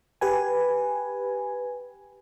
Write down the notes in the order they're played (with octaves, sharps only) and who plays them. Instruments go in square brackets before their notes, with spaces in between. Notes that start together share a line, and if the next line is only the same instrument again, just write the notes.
[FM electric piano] G4 B4 G#5